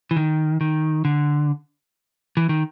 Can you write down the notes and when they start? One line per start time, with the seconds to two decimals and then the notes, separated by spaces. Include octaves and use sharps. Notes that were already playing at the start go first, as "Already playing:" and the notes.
0.11 E3
0.16 D#3
0.61 D#3
1.05 D3
2.37 E3
2.49 D#3